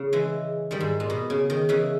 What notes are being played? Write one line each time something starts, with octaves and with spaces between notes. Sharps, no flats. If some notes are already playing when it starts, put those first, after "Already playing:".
Already playing: C#3
E3 G#3
D#3 G3
G#2
A#2
B2
C#3
D#3
C#3 E3